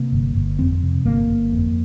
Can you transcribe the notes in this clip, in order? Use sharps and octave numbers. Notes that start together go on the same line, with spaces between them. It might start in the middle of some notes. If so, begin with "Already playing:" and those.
Already playing: C3 A#3
G1
G1
F2 C4
C3
G1 A#3
G1
F2